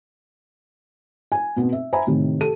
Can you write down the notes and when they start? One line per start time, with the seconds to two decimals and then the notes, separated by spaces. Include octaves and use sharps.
1.32 G#5
1.56 B2 B3 C4
1.72 E5
1.93 C5 E5 G#5 A#5 B5
2.07 A2 C3 D#3
2.41 G4 A4 D#7